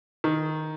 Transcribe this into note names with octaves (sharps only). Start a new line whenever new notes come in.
D#3